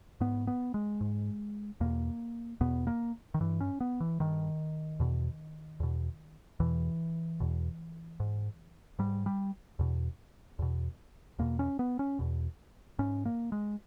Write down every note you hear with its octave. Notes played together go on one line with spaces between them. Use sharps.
G#2 B3
B3
G#3
G#2
E2 B2 A#3
E2 B2 B3
A#3
D#3
G2 E3
C#4
B3
E3
G2 D#3
E2 B2
E2 B2
E2 B2 E3
E2 B2
G#2
G#2 G3
G3
E2 B2
E2 B2
E2 B2 A#3
C#4
B3
C#4
E2 B2
G#2 C#4
A#3
G#3